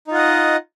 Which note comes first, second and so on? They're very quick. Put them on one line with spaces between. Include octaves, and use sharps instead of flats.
D#4 F4 F#5 D#5